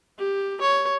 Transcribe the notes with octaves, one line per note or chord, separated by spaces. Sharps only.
G4
C#5